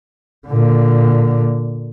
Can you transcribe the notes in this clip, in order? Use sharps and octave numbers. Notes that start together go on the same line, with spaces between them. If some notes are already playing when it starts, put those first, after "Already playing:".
A#2 D3